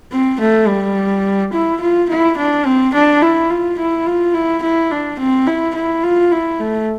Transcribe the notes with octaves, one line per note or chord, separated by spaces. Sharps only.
C4
A3
G3
E4
F4
E4
D4
C4
D4
E4
F4
E4
F4
E4
E4
D4
C4
E4
E4
F4
E4
A3